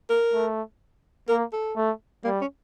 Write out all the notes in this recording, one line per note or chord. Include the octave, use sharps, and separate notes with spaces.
A#4
A3
A#3 A#4
A4
A3
G3 A#3
C#4